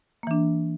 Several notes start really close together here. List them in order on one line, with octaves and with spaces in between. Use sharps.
A#3 E3 D4